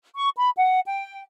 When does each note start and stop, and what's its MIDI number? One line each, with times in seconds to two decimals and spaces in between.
0.16 0.29 85
0.37 0.50 83
0.56 0.80 78
0.85 1.21 79